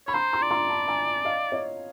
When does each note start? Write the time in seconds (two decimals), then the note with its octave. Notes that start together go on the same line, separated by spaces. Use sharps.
0.07 C#5 B5
0.14 C5 A#5 C6
0.33 A#5 C6
0.42 D5
0.51 A#5 C6
0.69 A5 B5
0.88 G#5 A#5
1.25 D#5 F5
1.52 C#5 D#5